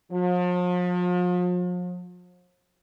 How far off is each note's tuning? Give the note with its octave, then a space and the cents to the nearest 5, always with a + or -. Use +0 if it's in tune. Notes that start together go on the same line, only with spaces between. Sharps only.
F3 +40